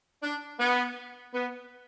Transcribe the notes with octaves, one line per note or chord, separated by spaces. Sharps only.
D4
B3
B3